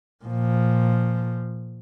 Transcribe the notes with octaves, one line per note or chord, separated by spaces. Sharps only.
A#2 F3